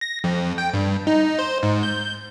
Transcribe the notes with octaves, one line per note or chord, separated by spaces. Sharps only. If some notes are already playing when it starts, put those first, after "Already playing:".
A#6
F2
G5
G2
D#4
C5
G#2
G6